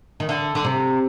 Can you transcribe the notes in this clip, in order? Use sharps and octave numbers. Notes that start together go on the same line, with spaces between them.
D#3
D3
D3
C3